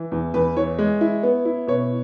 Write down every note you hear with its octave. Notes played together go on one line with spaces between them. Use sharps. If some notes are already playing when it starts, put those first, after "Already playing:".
Already playing: E3
E2
E2 B4
E3 C#5
G#3
E4
B3
E4
B2 C#5